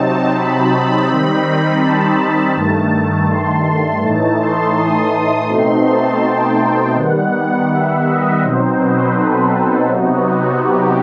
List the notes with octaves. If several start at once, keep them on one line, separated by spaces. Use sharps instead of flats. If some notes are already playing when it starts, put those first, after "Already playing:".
Already playing: C3 F#3 C4 D#4 A5
B5
D#3 G3 C4 D#4 B5
A5
G2 D#3 A3 A5
C6
A2 E3 A3 D#4 A5
C6
D#6
B2 A3 C4 D#4 C6
A5
G5
D#3 G3 B3 F#5
E5
D#5
B2 F#3 C4 D#4 C5
B4
A4
C3 F#3 B3 D#4 F#4
G4